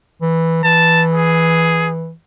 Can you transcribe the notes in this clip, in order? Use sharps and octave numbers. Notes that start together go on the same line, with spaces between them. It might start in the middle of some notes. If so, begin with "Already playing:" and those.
E3
E3 A5
G#4